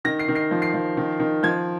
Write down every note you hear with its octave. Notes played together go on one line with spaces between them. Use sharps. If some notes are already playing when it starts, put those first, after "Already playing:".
D#3 A#6
C7
D#3
C7
F3
C7
F3
D#3
D#3
F3 G#6